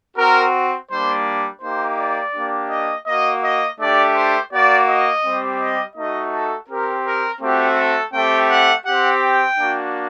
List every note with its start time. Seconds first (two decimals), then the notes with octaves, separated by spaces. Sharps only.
0.16 C4 F#4 A#4
0.90 G3 A#3 D4 C5
1.61 A#3 D#4 G4 C5
1.98 D5
2.33 A#3 D4 G4
2.70 D#5
3.06 A#3 F#4 D#5
3.42 D#5
3.79 A3 D4 G4 D5
4.15 C5
4.52 A#3 F#4 D5
4.88 D#5
5.23 G3 C4 G4
5.59 D#5
5.95 A3 D#4 F#4 D#5
6.32 A4
6.68 C4 G4 A#4
7.05 A#4
7.40 A3 C4 F#4 G4
7.77 A4
8.13 A3 C4 G4 G5
8.49 F#5
8.85 C4 G4 F#5
9.22 G5
9.57 A#3 D4 F#4